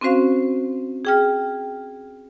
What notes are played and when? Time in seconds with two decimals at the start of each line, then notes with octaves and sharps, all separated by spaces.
0.01 C4 C#4 F#4 C5 F5
1.05 G#4 G5 F6